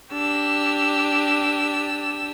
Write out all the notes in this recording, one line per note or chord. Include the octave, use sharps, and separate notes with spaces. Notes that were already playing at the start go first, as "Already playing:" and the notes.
D4 G4 E6